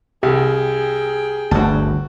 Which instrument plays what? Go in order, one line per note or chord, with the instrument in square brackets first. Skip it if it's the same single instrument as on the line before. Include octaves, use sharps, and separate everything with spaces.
[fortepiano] C2 [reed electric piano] G4 [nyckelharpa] G#4 G5
[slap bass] G1 D2 [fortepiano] F#4 A5